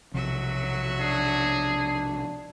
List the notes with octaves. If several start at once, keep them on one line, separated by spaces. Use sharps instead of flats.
B1 C3 F3 F#3 F#4 E5
D4 G#4